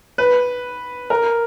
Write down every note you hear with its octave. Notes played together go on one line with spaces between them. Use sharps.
B4
A#4